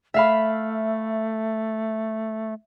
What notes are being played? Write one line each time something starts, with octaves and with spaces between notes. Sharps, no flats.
A3 E5 F5 B5